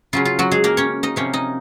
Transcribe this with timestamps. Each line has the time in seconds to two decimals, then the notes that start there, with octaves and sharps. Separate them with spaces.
0.13 C#3 F#3 C#4 F4
0.25 F4
0.39 F#3 F#4
0.51 G#3 G#4
0.64 A#3 A#4
0.77 C#4 C#5
1.03 D#4 D#5
1.16 C3 F3 A#3 C#4 C#5
1.33 D#4 D#5